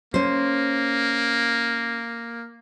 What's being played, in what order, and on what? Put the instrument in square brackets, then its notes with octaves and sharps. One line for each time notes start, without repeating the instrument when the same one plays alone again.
[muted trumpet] A#3 [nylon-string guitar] C#4 C5